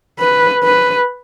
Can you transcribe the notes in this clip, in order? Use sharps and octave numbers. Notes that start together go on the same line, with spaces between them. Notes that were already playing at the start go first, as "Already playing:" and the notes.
B4
B4